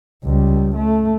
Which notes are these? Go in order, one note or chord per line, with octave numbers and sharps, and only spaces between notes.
C#2 G3
A3